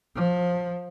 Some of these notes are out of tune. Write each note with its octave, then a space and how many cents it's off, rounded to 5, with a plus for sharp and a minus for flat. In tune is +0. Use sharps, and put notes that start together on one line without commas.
F3 +20